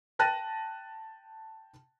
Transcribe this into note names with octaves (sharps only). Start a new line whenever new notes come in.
G5 A5 F#6 A6 A#6 D#7